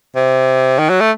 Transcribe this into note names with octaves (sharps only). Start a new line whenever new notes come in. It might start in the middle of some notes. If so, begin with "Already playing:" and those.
C3
D#3
F#3
A3